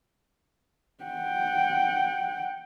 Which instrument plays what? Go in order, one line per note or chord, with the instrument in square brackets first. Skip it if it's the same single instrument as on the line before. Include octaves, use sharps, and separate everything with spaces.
[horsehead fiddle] F#5 G5